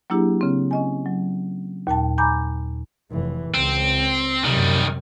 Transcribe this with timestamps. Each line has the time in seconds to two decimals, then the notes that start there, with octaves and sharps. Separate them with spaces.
0.10 F#3 A#3 D4 E4 G4 G#4
0.41 C#3 C4
0.71 C#4 D#5 G#5
1.06 F#3
1.87 D#2 A#2 G5 A5
2.18 G#5 A#5 B5 D6 G6
3.11 F1 E3
3.54 C#2 C4
4.44 F#2 C3 D#3 G3